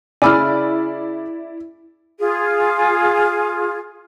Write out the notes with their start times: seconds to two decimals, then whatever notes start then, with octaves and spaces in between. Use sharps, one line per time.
0.22 C#3 E4 D5 G#5 B5 D6 E6 F6
2.19 F4 G#4